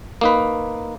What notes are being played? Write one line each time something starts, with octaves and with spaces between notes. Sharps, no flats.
A#3 D#4 B4